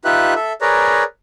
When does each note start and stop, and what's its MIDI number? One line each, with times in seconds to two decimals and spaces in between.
0.05 0.34 63
0.05 0.34 65
0.05 0.34 67
0.05 0.34 71
0.05 0.34 76
0.05 0.34 90
0.35 0.53 69
0.35 0.53 76
0.61 1.03 68
0.61 1.03 70
0.61 1.03 71
0.61 1.03 73
0.61 1.03 74
0.61 1.03 82